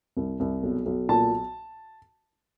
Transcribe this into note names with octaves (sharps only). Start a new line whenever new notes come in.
C2
C2
B1
B1
A#2 A5